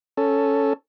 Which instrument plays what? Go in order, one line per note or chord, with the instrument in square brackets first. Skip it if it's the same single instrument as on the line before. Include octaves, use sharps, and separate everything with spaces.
[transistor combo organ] C#4 A4